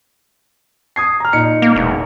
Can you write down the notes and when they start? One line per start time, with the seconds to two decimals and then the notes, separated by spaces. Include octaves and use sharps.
0.96 D#6 G#6 C7
1.20 A#5 F6
1.33 A#2 D#4 C#7
1.62 A#3
1.76 E1